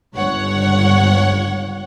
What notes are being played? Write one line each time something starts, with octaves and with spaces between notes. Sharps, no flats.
G1 C#2 C#5 F#5